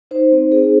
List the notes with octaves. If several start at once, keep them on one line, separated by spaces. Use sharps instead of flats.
D#4 C5
C4
C4 G#4